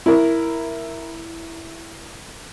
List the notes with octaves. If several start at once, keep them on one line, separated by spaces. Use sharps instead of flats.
E4 A#4